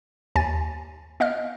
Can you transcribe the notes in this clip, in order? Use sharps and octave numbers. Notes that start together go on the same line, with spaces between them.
D#2 G#5 A6
B3 D#5 F5 F6